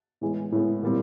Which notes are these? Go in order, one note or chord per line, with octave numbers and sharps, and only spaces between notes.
A2 E3 G#3 B3
A2 E3 G#3 B3
A#2 G3 C4